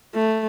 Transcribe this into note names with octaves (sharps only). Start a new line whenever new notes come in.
A3